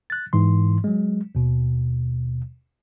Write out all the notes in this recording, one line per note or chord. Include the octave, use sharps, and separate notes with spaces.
F#6 A6
G#2 E3 C6
F#3 G#3
D#2 B2